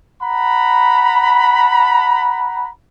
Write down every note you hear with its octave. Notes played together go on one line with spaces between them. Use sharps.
F#5 A#5 B5